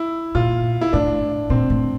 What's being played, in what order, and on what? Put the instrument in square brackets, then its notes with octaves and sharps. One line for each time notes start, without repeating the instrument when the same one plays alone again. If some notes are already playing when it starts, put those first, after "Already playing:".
Already playing: [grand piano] E4
[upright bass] A#2 [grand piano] F4
[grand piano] E4
[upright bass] A2 [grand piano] D4
[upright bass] A#2 [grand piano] C4
[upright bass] A2